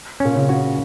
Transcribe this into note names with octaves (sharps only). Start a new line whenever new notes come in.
A#2 C#4
C#3
F#4